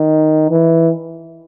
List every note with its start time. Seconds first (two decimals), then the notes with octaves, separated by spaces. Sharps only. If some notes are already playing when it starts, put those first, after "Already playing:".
Already playing: D#3
0.50 E3